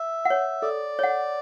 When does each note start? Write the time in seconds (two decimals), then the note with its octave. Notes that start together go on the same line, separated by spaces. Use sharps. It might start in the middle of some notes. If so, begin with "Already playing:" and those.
Already playing: E5
0.25 C#5 F#5
0.62 A4 D5
0.99 C#5 F#5